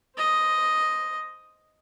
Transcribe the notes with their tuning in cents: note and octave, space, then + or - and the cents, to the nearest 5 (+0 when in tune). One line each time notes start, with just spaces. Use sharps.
C5 +0 D#5 +0